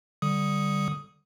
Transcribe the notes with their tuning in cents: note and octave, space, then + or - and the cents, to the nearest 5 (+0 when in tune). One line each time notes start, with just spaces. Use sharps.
D3 +0 G3 +0 D#6 +5